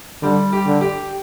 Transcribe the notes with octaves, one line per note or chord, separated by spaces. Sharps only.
D3 G3
G4
D3
G4